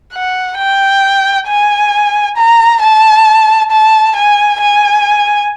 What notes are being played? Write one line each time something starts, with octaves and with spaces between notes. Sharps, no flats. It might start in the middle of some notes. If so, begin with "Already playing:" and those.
F#5
G5
G#5
A#5
A5
A5
G#5
G#5